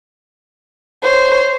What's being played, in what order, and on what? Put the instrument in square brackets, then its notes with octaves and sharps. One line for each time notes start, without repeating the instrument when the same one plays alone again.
[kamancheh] C5 C#5